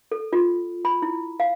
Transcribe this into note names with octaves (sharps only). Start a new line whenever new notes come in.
A4
F4
B5
E4
F5